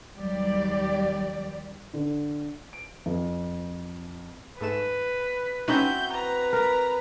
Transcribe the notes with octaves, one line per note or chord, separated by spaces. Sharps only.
D#2 F#3 G3 G4 D5
D3
D7
F2
G#2 A3 B4 E7
C4 C#4 D#4 E4 F#4 G6
B4 A#5
A#4 A#5